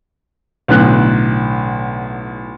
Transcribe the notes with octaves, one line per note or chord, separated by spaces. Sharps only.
B1 A2 D3 F#6